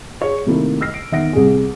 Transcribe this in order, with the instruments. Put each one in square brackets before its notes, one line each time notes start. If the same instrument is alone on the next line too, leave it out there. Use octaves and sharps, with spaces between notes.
[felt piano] G#4 C#5
C3 D#3 A3 A#3 E4
D#5 E6 F6 A#6 C7
D7
E1 D#3 E5 F#5 A#6 D7
C2 G#4